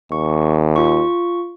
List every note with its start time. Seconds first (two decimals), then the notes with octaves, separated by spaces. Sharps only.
0.12 D#2 C#6
0.76 F4 C#6